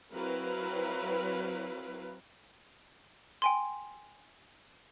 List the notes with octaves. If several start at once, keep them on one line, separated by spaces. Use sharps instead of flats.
F#3 C4 E4 A#4 B4 F5
G5 G#5 C6